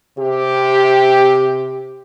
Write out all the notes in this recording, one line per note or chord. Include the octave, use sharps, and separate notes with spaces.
C3 G4